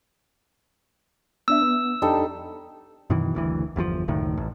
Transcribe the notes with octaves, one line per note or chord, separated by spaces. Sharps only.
B3 D4 E5 E6
B3
F2 G3 D4 D#4 A4
F#2 B2 D#3 E3
F#1 D2 E3
G1 E2 B2 F3
F#1 D2 A2 D#3
A1